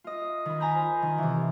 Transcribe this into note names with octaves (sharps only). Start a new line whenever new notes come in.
F4 D#5
D#3 B5
G#5 A#5 B5 G6
F4 C5
D#3
C3 E3